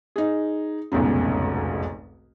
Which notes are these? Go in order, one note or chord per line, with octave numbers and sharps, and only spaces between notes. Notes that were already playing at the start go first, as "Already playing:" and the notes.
D#4 G#4
F1 B1 E2 G#2 C#3